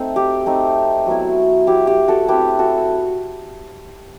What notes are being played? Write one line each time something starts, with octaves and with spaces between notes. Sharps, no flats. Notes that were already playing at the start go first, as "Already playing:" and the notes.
Already playing: A3 C4 D#4
G4
A3 C4 D#4
F#3 B3 E4
F#3 B3 E4 G4
G4
F#4 A4
A3 C4 E4 G4 B4
F#4 A4